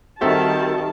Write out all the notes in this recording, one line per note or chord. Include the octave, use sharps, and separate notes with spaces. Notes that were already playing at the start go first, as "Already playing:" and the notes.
D#3 G3 C4 F#4 A4 C5 E5 A5